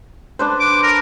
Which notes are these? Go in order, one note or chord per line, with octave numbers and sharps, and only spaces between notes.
D4 B4 C5
D6
A#4